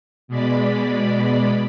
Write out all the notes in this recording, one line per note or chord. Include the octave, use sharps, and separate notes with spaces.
B2 G#3 D5 B5